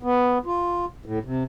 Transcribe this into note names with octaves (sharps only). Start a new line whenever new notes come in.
B3
F4
A2
C3